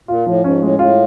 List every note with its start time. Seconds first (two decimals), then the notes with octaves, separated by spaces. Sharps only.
0.08 A#2 F4
0.26 A2 F3
0.44 G#2 C#4
0.61 A2 G#3
0.74 A#2
0.79 A2 F4